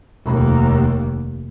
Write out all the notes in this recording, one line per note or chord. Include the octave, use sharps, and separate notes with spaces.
F1 D#2